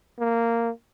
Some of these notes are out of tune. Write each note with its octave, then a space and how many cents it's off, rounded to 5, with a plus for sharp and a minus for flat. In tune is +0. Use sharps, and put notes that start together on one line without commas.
A#3 -10